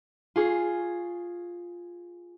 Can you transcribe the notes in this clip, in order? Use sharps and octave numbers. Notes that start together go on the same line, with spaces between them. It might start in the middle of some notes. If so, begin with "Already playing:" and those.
F4 G#4 C#6